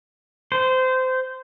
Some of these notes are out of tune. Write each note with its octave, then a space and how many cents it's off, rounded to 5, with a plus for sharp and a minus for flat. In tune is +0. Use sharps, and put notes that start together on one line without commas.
C5 -20